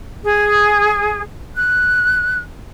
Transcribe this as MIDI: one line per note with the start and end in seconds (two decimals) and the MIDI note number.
0.24 1.21 68
1.55 2.38 90